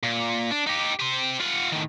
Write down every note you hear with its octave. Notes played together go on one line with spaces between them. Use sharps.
A#2
D4
D#4 G4
G4 C5
F4 F#5
A2 D#3